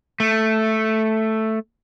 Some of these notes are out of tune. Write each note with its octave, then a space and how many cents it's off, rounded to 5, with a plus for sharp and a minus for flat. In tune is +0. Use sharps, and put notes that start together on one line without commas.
A3 +0